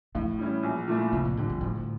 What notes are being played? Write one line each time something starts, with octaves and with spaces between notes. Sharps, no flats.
A2 E3
G3 C#4 E4
A#1
A#2 A3 E4
F2 C#3
A#2
A2 D3 G3
F2
D2 A2